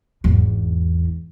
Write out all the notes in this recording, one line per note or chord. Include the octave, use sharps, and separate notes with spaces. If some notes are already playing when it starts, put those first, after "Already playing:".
G#1 E2